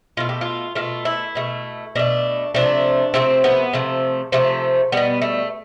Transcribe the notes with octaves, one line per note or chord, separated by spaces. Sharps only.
B2 A3 F4
G4
F4
B2 A3 F4
E4
B2 A3
B2 A3 D4
C3 F3 A3 D4
C3 F3 A3 C4
B3
C3 F3 A3
C3 F3 A3
B2 G3 B3
A3